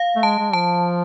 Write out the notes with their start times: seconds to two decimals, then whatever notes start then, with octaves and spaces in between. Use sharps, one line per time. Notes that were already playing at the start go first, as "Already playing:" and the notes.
Already playing: F5
0.16 A3
0.23 G#3 A5
0.39 G#3
0.53 F3 A5